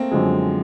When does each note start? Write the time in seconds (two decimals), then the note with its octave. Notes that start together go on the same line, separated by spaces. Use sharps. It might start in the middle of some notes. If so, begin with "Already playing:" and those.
Already playing: A3 A#3 C4
0.11 F#2 D3 F3 G#3